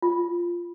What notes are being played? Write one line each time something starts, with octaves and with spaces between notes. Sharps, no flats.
F4